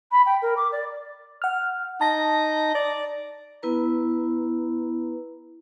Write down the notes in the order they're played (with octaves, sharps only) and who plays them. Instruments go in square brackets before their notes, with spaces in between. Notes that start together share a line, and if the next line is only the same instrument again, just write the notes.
[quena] B5
G5
A#4
D6
D5
[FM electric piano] F#5 F6
[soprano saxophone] D#4 [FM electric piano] A5 A#6
[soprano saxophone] D5
[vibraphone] B3 E4 B4 A#5